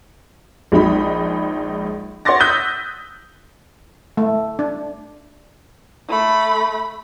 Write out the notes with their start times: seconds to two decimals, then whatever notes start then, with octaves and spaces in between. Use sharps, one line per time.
0.72 A#1 G#3 D#4 B5
2.25 C#5 F#5 C6 D6 A6 A#6
2.40 D#6 E6 F#6 G6 B6
4.17 A3
4.59 D4
6.09 A3 B5